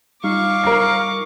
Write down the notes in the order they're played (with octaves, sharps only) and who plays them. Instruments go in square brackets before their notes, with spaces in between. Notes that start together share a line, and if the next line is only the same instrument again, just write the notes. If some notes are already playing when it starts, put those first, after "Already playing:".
[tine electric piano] G3 D#4 F4 [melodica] F5 [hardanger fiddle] C#6 D6
[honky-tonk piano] A#4 C7